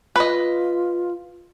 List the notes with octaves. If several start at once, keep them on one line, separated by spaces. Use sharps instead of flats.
F4 B4 D#5